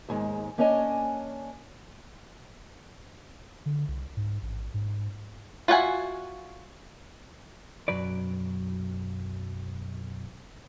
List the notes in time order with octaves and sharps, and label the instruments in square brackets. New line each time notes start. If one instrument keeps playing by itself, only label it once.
[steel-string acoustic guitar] D#2 G#2 G#3
A#3 C#4 D4 C#5 D#5 G#5
[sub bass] D3
C2
G#2
A1
G#2
[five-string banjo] F4 F#4 E5 F#5 G#5
[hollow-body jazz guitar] B1 F#2 F#3 B4 D5